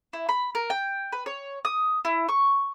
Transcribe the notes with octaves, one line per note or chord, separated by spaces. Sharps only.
E4
B5
A#4
G5
B4
C#5
D#6
E4
C#6